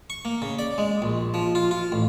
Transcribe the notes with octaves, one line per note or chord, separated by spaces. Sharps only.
C#6
A#3
C#3
D5
G#3
A#1
F3
F4
F4
A1